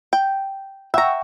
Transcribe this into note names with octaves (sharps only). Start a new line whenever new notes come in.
G5
E5 F#5 G5 A#5 C#6